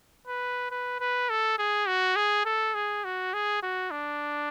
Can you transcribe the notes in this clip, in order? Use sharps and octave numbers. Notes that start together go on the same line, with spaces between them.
B4
B4
B4
A4
G#4
F#4
G#4
A4
G#4
F#4
G#4
F#4
D4